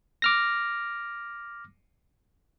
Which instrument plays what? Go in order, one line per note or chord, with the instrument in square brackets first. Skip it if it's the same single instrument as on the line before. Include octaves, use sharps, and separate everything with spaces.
[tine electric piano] D6 F6 A#6